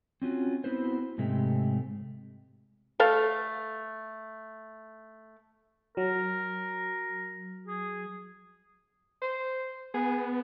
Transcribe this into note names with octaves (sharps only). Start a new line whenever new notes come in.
C4 C#4 F4 F#4
B3 C4 E4 F#4 B4 C5
G#2 C3 G#3 A3 C4 G4
A3 A4 F5
F#3 A#4
G#4
C5
B3 G#4